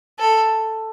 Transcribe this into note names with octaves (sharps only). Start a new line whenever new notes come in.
A4